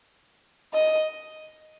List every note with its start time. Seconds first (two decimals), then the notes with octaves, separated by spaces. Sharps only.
0.74 D#5